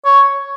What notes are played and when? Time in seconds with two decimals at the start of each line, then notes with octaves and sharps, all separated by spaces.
0.05 C#5